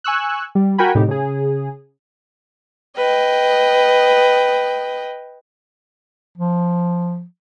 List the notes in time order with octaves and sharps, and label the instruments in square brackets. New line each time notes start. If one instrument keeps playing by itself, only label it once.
[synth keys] G#5 C#6 E6 F#6
G3
F#4 A#4 G5 G#5 B5
A2 C3 D#4 G4
C#3 G#4
[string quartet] B4 D#5 G5
[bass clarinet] F3